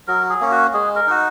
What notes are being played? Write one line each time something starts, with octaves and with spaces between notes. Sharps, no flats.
F#3 A#4
G#4
A#3 C#4
F#4
G#3 G#4
A#4
D#4 F#4